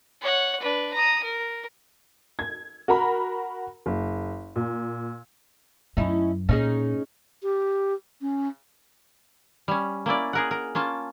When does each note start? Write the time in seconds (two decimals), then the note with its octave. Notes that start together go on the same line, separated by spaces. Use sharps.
0.21 C#5 F#5
0.60 D4 B4
0.93 A#5 D#6
1.24 A#4
2.39 G#6
2.88 F#4 A#4 A#5 B5
3.86 F#1
4.56 A#2
5.97 F#2 C#4 D#4 E4
6.49 A#2 C#4 D#4 G#4
7.43 G4
8.21 C#4
9.68 G3 C#4
10.06 A#3 C#4 E4 D5
10.33 G#4 A#4 F#5
10.51 A#4
10.75 A#3 C#4 F4 A5